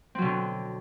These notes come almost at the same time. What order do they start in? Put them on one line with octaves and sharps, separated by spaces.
C4 F#3 B2 D3